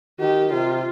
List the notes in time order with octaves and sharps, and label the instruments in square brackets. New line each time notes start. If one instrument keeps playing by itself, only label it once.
[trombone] D#3 [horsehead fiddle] G4
[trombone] C3 [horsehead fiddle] F4